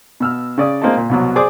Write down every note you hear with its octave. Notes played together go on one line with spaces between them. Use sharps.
B2 E6 F6
C#3 D5 D#6
G#3 A#3 C4 F4 D#5 A5
A#2
C2 B2 F#3
G#4 C5 D5 D6 D#6